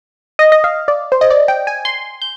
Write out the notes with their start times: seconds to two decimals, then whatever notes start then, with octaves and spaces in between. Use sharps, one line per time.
0.39 D#5
0.52 D#5
0.64 F5
0.88 D5
1.12 C5
1.21 D#5
1.30 D5
1.48 G5
1.67 G#5
1.85 C6
2.22 G6